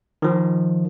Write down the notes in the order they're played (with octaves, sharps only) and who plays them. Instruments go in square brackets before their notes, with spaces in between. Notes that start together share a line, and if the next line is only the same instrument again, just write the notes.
[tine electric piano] D#3 F3